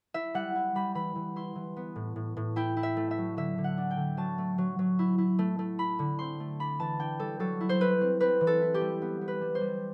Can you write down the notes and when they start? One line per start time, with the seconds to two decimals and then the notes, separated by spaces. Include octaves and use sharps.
0.14 E4 E5
0.34 G3 F#5
0.55 E4
0.75 G3 B5
0.95 E3 B5
1.15 E3
1.36 E4 C6
1.55 E3
1.76 B3
1.96 A2
2.16 A2
2.37 A2
2.56 E4 G5
2.77 E4
2.83 E5
2.97 A3
3.11 E5
3.18 F#3
3.37 D3 E5
3.58 D3
3.64 F#5
3.78 D4
3.91 G5
3.97 D3
4.17 F#3 A5
4.38 A3
4.58 F#3
4.79 F#3
4.99 E4
5.18 E4
5.39 A3
5.59 A3
5.79 E4 B5
5.99 D3
6.19 C4 C6
6.40 A3
6.60 D4 B5
6.79 E3 A5
6.99 D4 G5
7.19 G3 A4
7.39 F#3 A4
7.61 E4
7.69 C5
7.81 E4 B4
8.01 C4
8.20 C4 B4
8.41 E3
8.47 A4
8.61 E4
8.74 G4
8.81 G3
9.02 B3
9.21 B3
9.28 B4
9.41 G3
9.55 C5
9.61 G3